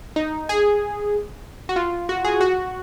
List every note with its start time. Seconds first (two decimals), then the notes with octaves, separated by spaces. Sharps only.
0.16 D#4
0.49 G#4
1.69 F#4
1.76 F4
2.09 F#4
2.25 G#4
2.41 F#4